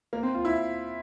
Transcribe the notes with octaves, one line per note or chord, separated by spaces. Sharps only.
A#3
C4
F4
E4